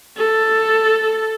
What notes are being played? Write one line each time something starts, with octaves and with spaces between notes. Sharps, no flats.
A4